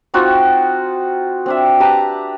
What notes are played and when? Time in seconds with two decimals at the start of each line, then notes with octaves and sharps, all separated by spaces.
0.14 C4 D#4 F4 F#4
1.46 C4 D4 E5
1.80 G4 B4 A5 A#5